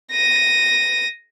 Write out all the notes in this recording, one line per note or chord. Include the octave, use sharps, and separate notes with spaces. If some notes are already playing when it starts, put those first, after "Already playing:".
A#6 D#7